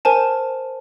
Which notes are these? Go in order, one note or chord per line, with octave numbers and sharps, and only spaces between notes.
A#4 C5 G#5 A5